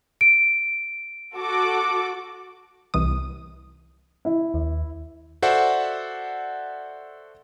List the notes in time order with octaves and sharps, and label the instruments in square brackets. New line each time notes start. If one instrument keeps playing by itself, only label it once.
[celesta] D7
[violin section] F#4 A4 D6
[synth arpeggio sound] C2 E3 D#6
[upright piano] E4
[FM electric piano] D#2
[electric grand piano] F#4 A4 C5 D5 E5 F#5